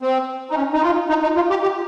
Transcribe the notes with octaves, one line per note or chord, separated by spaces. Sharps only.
C4
D#4
C#4
D#4
F4
D#4
D#4
F4
G4
G4